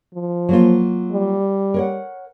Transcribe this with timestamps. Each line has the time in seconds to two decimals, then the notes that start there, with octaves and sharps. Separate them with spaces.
0.14 F3
0.49 F#3 A#3 F4
1.13 G3
1.74 A#4 C#5 F#5